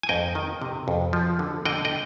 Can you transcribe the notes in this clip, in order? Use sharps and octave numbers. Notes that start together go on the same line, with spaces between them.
G#5
F2 D#5 G5
D#3
C3
F2
F3
D3
D3 D#5 G5
D#5 G5